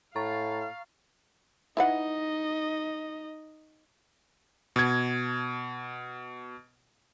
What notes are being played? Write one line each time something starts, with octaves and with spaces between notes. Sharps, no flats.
A2 F5 A#5 C#6 A6
D#4 E4 B4 D#5 F#5
B2 G#6